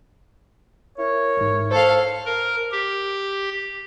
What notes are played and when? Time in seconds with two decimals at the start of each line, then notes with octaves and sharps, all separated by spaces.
0.97 E4 A#4 C#5
1.37 A1 G#2
1.71 A4 C5 F5
2.26 A#4
2.72 G4